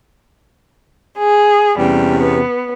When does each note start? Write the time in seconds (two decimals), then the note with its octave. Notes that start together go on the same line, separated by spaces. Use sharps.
1.17 G#4
1.78 E2 C3 G3 C#4
2.19 B3